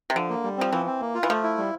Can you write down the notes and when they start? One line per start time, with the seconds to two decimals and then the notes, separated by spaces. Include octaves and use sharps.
0.10 C3
0.15 D3 F3
0.30 A#3
0.43 G3
0.57 F3 C4
0.73 E3 F3
0.86 C4
1.01 A#3
1.15 F4
1.23 E3
1.30 F3 A3
1.43 E4
1.57 G3